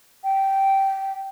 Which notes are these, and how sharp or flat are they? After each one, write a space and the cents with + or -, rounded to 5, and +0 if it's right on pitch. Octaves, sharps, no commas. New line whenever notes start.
G5 -15